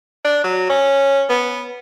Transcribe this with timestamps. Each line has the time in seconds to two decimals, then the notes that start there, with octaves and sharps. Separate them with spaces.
0.24 D4
0.44 F#3
0.70 C#4
1.30 B3